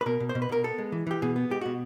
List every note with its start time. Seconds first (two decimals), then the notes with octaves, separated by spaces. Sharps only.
0.01 B4
0.06 B2 A#4
0.20 B2
0.29 C5
0.35 B2
0.42 B4
0.49 B2 A#4
0.64 B3 A4
0.78 G#3
0.92 E3
1.07 E3 G4
1.22 B2 G#4
1.36 B3
1.50 G#3 G4
1.61 B2 F#4